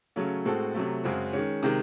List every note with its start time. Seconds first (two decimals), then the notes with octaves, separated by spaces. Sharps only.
0.16 C#3 F#3 A3 C#4
0.45 A2 G#3 C4 F#4 A4
0.75 C3 F#3 A3
1.04 F#2 C#3 G#3 C4 F#4
1.33 D#3 G#3 C#4
1.63 C3 D#3 G#3